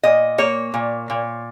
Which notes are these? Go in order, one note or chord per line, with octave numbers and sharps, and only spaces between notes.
A#2 D#5
A#3 C#5
A#2
A#2